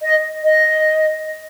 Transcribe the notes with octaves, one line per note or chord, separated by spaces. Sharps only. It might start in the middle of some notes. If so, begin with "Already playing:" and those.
D#5
D#5